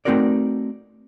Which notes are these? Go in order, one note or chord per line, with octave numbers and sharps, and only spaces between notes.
A3 C4 D#4 F#4 A#4 D5